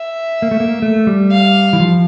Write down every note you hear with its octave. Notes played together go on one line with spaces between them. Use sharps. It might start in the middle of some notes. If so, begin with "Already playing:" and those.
Already playing: E5
A#3
A3
A#3
A3
G3
F5
E3
F3